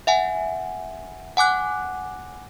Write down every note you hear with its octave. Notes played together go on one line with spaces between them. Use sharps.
E5 F#5 G#5
F#5 G#5 D6 F#6